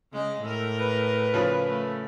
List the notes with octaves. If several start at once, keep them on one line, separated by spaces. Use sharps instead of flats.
C#3 G#3 D#5
A2 A#4
B4
C#3 F3
A3